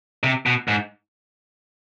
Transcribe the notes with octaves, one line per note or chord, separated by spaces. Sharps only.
C3
B2
G#2